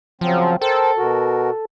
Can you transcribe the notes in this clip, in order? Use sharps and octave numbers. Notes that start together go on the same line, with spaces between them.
C#3 F3 F#3 C4
A4 A#4 C5 G5
B2 F#4 A#4